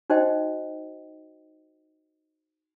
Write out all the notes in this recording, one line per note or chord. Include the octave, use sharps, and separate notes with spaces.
D#4 F#4 C5 D#5 G5